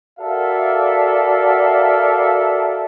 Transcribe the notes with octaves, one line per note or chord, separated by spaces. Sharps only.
F#4 A4 A#4 D5 E5 F5